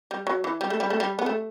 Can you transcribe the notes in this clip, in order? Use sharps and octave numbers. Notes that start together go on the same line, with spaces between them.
G3
F#3
E3
G3
A3
G3
A3
G3
B3
A3